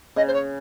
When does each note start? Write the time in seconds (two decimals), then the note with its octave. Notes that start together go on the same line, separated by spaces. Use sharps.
0.16 C#3 D#5
0.27 C5
0.33 C#5